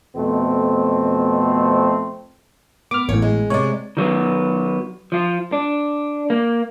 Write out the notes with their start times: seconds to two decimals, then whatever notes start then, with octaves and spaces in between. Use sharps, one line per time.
0.15 F2 B2 A3 C4
2.91 B3 D6 F6
3.09 A1 A2 C#5
3.22 G#3
3.50 C3 G#3 C#5 D5
3.97 D#3 F#3 B3
5.12 F3 F4
5.52 D4
6.30 A#3